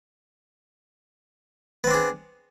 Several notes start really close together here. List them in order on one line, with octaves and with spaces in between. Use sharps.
B3 C4 D4 G#4